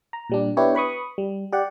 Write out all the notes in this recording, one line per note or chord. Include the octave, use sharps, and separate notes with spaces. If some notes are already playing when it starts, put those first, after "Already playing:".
A#5
A#2 G3 D4
B3 D4 E4 G4 B4 C#5
B4 B5 C#6 D#6
G3
G4 D5 F#5